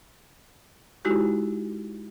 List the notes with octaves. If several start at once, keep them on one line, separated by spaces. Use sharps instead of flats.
G#3 D#4 E4 F#4 G4